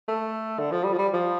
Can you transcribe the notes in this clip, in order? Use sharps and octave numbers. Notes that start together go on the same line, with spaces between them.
A3
D3
F3
G3
F3
G3
F3